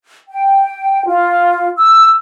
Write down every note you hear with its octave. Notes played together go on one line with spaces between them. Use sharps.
G5
F4
E6